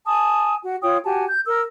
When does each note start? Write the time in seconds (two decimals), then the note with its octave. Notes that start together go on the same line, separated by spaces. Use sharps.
0.07 G#5 A5 D#6
0.63 F#4
0.82 F4 C#5 G5 D#6
1.05 F#4 G4 G#5 A5
1.28 G6
1.47 A#4 E6